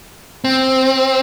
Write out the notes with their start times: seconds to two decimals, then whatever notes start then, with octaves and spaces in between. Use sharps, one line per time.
0.44 C4